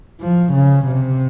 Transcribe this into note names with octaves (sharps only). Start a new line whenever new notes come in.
F3
C#3
C3